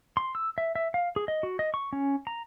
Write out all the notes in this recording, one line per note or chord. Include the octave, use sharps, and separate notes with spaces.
C6
E6
E5
E5
F5
G#4
D#5
F#4
D#5
C#6
C#4
A#5